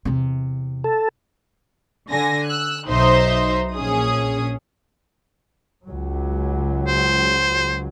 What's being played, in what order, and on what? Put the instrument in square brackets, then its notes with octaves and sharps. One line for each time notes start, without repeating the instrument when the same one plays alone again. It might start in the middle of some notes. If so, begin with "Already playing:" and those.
[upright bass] E2 C3
[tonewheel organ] A4
[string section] D3 G#5 A#6
E6 F#6
B1 D#4 C5 E5 C6
A#1 C#4 G#4 D#6
[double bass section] C#2 F#3
[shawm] C5